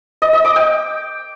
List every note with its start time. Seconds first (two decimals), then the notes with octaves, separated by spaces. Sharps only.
0.22 D#5
0.33 D#5
0.45 D6
0.56 G5